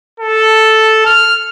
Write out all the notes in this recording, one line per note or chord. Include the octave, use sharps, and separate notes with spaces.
A4
F6